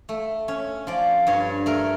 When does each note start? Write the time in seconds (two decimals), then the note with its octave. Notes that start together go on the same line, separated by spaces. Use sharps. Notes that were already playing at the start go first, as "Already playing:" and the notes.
0.09 A3
0.48 C#4
0.87 F3 D5
1.27 G2 C#5
1.66 A3 A#4